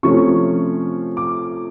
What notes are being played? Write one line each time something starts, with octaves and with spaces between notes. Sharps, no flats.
C3 F3 A3 C#4 C#6
D6